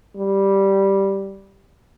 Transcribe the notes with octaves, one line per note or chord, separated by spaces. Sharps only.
G3